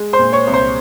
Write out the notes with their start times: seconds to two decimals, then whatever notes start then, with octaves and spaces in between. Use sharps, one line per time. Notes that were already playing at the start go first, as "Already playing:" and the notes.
Already playing: G#3
0.13 C5 C6
0.19 A#2
0.33 C#5 C#6
0.47 C2
0.53 C5 C6